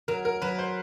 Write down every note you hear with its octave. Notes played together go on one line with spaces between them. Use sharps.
F#3 A#4
A#4
F#3 B4
C5